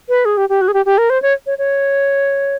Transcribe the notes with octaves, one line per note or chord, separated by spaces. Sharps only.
B4
G#4
G4
G4
F#4
G#4
G4
G4
A#4
C5
C#5
C#5
C#5